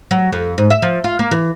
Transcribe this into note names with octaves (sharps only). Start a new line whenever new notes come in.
F#3
F2
G#2
E5
F3
F4
A#3
E3